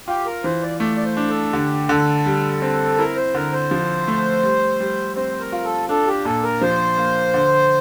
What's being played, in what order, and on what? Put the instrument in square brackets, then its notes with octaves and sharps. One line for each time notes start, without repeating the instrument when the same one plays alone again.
[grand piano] F4 [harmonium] G4
[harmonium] A#4
[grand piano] E3 [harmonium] C5
[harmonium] D5
[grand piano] A3 [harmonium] D5
[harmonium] D5
C5
[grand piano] D4
[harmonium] A4
[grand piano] D3 [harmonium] G4
[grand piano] D3 [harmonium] A4
[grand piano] G3
C4
[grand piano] E4 [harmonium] A#4
[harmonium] C5
[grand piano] D3 [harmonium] A#4
[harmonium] C5
[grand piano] F3
A3
G3
G3
[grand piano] C4 [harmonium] C5
[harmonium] A#4
[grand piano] F4
[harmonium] A4
[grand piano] D4 [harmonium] A4
[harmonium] G4
[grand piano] A#2 [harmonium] A4
[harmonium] A#4
[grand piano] F3 [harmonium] C5
[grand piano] A#3
D3